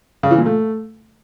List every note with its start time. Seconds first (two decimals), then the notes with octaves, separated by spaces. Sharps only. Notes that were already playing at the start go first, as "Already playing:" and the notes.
0.23 C#3
0.31 E3
0.38 A#2
0.46 A3